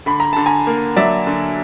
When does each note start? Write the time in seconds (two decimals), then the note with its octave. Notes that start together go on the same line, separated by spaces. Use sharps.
0.06 D3 B5
0.20 A#5
0.33 D3 A5
0.46 G#5 A#5
0.67 A#3
0.96 F#3 D5 E5
1.27 D3